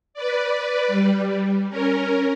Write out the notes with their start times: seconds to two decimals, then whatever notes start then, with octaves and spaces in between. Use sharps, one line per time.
0.14 B4 D5
0.88 G3
1.70 C#4 A#4